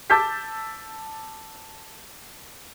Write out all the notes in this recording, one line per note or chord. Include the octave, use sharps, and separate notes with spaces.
A5 D6 E6 G6 A6 B6